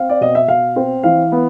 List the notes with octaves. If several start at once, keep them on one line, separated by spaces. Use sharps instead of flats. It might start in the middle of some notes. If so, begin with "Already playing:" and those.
Already playing: C4 F5
D5
B2 D#5
E5
B2 F5
C4
E3 F5
B3